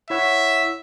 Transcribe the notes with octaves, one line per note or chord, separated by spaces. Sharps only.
E4 C#5 E5 F#5